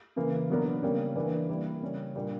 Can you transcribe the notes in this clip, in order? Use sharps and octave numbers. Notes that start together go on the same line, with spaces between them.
C#3 E3 A#3
B2 F#3 B3 D4 A#4
C#3 G3 A#3 C#4
E3 A#3 D4
G3 A#3 E4
C#3 G3 C#4
A#2 G3 A#3 D4